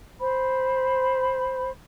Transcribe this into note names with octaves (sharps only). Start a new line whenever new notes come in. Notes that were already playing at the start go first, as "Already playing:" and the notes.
C5 B5